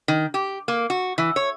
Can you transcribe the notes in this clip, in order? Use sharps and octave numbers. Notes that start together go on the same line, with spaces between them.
D#3
G4
A#3
F#4
E3
C#5